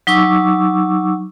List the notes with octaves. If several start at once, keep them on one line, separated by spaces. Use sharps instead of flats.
F#3 D#4 C#6 D6 E6